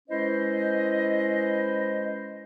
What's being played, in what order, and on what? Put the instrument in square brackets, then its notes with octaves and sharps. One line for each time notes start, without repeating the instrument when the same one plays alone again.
[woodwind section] G#3 C#4 E4 B4 C5 D#5